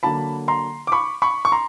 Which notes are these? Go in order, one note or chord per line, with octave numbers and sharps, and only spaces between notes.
D3 F#3 A#3 D4 A5 B5
A#5 C6
D6
B5 C#6
B5 C#6
C#6
A#5 C6